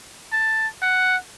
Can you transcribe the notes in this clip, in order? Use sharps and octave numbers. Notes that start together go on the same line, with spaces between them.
A5
F#5